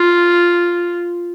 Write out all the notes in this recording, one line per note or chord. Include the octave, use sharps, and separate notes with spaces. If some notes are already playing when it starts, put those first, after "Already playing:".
Already playing: F4